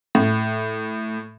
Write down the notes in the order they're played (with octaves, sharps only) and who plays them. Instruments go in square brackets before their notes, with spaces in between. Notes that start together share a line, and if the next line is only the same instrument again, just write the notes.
[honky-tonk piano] A2